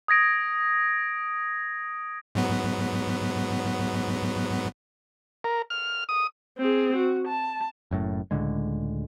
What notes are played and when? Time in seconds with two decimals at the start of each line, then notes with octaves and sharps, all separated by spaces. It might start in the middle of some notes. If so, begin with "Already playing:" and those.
0.08 D#6 G#6 A#6 D7
2.35 G#2 F#3 B3
5.44 A#4
5.70 F6
6.09 D#6
6.59 C4 G#4
6.96 F#4
7.28 A5
7.91 F#1 F#2 A2
8.31 C#2 A2 D3 G#3